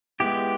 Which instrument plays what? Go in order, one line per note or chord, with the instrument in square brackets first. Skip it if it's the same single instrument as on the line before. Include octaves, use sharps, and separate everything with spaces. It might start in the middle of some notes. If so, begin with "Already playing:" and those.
[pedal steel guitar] G#3 B3 E4 G4